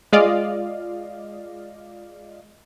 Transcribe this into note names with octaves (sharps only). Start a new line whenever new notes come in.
G#3 F4 D5 D#5 F5